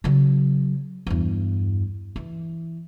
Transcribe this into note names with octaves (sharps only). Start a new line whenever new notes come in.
C#3 F#3
E2 G2
E3